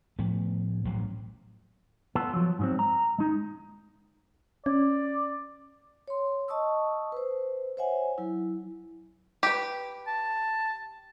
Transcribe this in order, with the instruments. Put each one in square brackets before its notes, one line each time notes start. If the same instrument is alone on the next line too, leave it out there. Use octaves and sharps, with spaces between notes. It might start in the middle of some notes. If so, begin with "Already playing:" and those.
[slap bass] A2 F3 A3 B3
A1 A2 F3 F#3
[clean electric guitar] B3 F4 A4
F3 F#3
G#2 F#3 C4
A#5
G#3 D#4
[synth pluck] C#4 [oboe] D5
[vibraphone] C#5 C6
D#5 A5 C#6 D#6 E6
B4 C5
C5 C#5 E5 F#5 G#5
F#3 E4
[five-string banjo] G4 B4
[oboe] A5